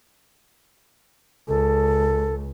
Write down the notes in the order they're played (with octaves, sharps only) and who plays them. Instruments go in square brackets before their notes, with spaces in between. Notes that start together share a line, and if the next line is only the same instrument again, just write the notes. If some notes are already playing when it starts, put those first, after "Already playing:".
[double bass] C#2 [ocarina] A4